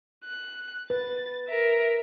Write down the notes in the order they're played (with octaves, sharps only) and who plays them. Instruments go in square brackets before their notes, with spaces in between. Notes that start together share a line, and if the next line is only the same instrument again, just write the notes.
[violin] F#6
[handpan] B4 [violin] A6
[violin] A#4 E5